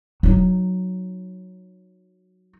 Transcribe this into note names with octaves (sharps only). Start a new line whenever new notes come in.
F#3 D#4